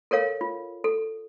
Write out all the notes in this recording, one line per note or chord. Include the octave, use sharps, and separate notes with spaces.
A4 A#4 C#5 F5
F4
A4